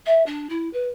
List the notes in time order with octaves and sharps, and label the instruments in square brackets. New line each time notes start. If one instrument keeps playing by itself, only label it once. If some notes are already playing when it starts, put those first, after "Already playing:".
[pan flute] E5
D4
E4
B4